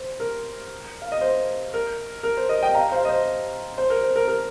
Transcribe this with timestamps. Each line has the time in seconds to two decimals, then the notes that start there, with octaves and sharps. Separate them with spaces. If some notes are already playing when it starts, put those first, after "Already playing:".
Already playing: C5
0.20 A#4
1.02 F5
1.12 D#5
1.21 C5
1.74 A#4
2.23 A#4
2.37 C5
2.49 A#4 D#5
2.62 D#5 G5
2.75 F5 A#5
2.92 C5 F5
3.05 D#5
3.09 C5
3.78 C5
3.90 A#4
4.03 C5
4.16 A#4
4.28 A#4